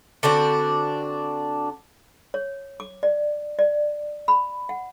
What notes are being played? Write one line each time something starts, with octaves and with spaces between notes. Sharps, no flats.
D3 C4 D4 F#4
C#5
D6
D5
D5
B5
F#5